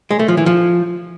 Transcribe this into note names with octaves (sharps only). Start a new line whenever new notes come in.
G#3
A3
F3
E3
F3